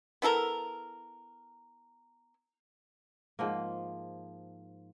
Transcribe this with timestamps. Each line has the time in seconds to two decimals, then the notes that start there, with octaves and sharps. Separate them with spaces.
0.22 B3 E4 A4 A#4
3.39 G#2 F3 A#3